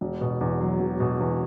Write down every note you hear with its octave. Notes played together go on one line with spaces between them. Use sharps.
E1
B2
E2
F#3
E1
B2
E2